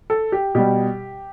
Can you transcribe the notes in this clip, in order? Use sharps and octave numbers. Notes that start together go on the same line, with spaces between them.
A4
G4
B2 G3 G4